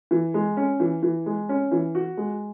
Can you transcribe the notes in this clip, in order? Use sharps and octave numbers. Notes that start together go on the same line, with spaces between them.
E3
G#3
C#4
E3
E3
G#3
C#4
E3
F#4
G#3